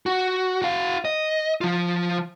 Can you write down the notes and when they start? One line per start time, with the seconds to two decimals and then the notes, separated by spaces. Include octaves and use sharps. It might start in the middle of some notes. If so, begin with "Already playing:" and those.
0.06 F#4
0.62 F#4 F5
1.05 D#5
1.61 F3 F4